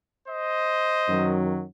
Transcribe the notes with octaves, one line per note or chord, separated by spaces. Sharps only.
C5 D#5
F#2 D#3 F#3